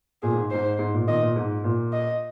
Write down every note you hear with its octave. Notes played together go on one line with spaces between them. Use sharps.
A#2 G#4
G#2
G#2 C5
G#2
A#2
A#2 D#3 D#5
A#2
G#2
A#2
D#5